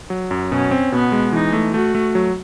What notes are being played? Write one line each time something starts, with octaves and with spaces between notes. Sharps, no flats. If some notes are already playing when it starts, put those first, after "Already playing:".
F#3
F#2
B2 C#4
C4
B2 B3
G#3
E3 D#4
A3
A3 F#4
A3
F#3